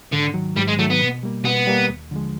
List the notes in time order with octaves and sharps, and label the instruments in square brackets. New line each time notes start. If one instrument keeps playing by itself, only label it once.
[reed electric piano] G#2 [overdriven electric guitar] D3
[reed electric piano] D#3 F#3
[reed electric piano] G#2 [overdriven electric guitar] G3
[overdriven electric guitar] G#3
[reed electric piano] D#3 F#3 [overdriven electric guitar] A3
[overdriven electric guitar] B3
[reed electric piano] B2
G3 A#3
[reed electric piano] B2 [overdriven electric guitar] B3
[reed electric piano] G3 A#3
D#2
D3 F3 G#3